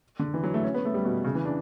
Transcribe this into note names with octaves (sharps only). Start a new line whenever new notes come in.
D3
E3
F#3
A3
C#4
B3
A3
G3
B2
C#3
E3
D4